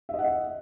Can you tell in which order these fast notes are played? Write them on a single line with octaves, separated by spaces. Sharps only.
E5 D#5 F#5